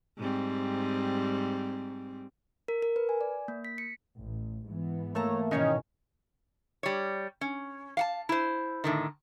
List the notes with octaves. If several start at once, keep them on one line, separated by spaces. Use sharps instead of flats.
G#2 G3 C4
A#4
A#4
B4
G#5
D5
A#3
B6
C#7
A1
G#2 E3 B3
A3 A#3 C#5 A5 A#5
G#2 B2 D#3 E3 C#4 D#4 C#5 D#5
G3 C#5
C#4
F5 F#5 A5
E4 C5
A2 D3 D#3